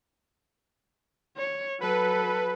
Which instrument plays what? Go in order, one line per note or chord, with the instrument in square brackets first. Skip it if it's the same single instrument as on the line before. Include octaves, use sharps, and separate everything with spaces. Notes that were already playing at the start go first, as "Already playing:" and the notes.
[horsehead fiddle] C#5
[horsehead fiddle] F#3 A4 [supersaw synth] B4